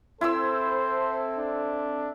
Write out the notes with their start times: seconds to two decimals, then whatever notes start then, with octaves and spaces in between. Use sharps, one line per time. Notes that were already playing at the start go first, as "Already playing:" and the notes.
0.21 C4 E4 A4 C5 C6 E6
1.37 D4